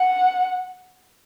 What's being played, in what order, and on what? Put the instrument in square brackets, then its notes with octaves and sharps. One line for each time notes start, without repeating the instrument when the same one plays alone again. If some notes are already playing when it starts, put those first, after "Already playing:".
Already playing: [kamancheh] F#5